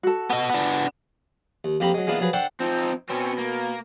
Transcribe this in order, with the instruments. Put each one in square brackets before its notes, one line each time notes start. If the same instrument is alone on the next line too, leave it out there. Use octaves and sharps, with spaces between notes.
[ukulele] F#4 A4
[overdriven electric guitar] B3 D#5
B3 D4
[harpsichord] D#2
F2 A#3 G4 A#5 B5
F#3 G#3
E3 G#3 A#3 B3 D4 F4
F3 F#3 G#4 B4
D4 A4 C5 F#5 G5 C#6
[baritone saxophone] F3 [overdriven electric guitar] C4 D#4
[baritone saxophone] B2 [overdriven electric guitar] C4 C#4
[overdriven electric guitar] A#3